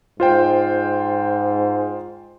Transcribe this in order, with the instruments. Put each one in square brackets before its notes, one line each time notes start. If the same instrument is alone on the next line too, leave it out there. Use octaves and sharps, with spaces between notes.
[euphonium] G#2 [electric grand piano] F4 C5 G5